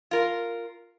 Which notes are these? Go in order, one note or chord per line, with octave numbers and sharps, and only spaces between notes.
F4 A#4